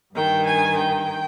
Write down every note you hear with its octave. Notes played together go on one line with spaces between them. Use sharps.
G2 D#3 G5
G#5
G5